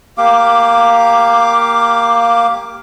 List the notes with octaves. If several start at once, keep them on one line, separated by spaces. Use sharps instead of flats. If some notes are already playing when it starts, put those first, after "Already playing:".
A#3 G4 F5 D6